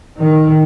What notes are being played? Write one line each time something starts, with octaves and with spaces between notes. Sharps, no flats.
D#3